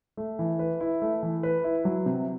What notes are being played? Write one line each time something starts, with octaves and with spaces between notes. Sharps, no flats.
A3
E3
B4
E4
A3
E3
B4
E4
F#3
C3